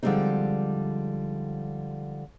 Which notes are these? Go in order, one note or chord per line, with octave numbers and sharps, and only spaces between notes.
D3 F3 G3 G#3 C4 D#4